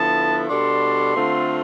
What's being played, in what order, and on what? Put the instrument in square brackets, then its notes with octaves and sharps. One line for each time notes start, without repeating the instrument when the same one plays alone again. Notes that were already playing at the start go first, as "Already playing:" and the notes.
Already playing: [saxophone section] D3 F3 B3 E4 A4 [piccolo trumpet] A5
[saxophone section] B2 G3 D4 A4 [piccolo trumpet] C6
[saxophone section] D3 A3 C4 F4